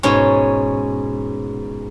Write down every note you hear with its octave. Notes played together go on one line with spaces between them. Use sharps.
G#2 B2 C#4